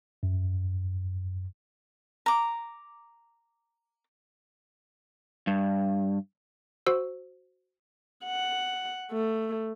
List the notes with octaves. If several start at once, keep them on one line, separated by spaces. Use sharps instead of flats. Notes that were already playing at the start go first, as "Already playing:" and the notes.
F#2
A#5 D6
G2
F#4 C5 E6
F#5
A3